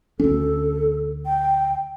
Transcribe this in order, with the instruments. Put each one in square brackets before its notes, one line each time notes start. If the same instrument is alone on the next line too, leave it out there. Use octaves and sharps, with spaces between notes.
[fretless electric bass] D2 C#4 [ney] A4
[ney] G5